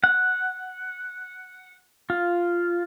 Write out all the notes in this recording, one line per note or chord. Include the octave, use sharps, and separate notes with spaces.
F#5
F4